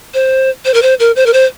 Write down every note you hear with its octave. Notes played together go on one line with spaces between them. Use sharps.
C5
C5
A#4
C5
A#4
C5
A#4
C5